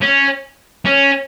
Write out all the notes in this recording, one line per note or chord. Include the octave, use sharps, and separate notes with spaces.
C#4
C#4